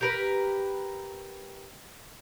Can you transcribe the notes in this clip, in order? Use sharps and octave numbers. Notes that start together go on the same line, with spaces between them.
G4 A#4 B4